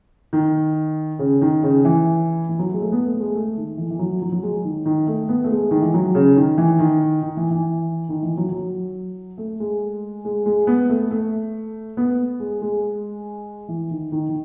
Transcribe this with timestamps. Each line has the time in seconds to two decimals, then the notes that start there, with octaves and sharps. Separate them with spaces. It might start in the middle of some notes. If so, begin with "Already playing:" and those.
0.33 D#3
1.19 C#3
1.42 D#3
1.63 C#3
1.85 E3
2.49 E3
2.59 F#3
2.74 G#3
2.82 A3
2.92 B3
3.07 A3
3.20 G#3
3.35 A3
3.57 D#3
3.77 E3
3.90 E3
3.99 F#3
4.22 F#3
4.32 F#3
4.43 G#3
4.64 D#3
4.86 D#3
5.07 A3
5.29 B3
5.44 A3
5.51 G#3
5.71 D#3
5.82 E3
5.94 F#3
6.15 C#3
6.36 D#3
6.58 E3
6.79 D#3
7.23 D#3
7.37 E3
7.51 E3
8.09 D#3
8.23 E3
8.37 F#3
8.52 F#3
9.38 A3
9.60 G#3
10.25 G#3
10.46 G#3
10.67 B3
10.89 A3
11.11 A3
11.97 B3
12.40 G#3
12.62 G#3
13.68 E3
13.91 D#3
14.12 D#3
14.29 D#3